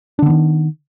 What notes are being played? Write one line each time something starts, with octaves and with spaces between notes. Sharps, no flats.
D3 D#3 B3 D4